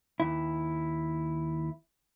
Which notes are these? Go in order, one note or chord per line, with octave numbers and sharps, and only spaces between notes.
D#2 E4